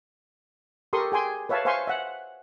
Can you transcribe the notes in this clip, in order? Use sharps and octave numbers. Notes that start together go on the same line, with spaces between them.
G4 A4 A#4 C6 C#6 D#6
G#4 G5 G#5 C6
B4 C#5 E5 F5 A5
C5 E5 F5 G#5 C6 C#6
E5 F#5